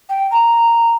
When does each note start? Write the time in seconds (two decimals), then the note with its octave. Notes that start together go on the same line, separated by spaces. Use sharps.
0.09 G5
0.31 A#5